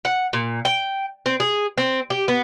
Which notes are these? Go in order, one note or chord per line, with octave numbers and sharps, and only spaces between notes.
F#5
A#2
G5
C4
G#4
C4
G4
B3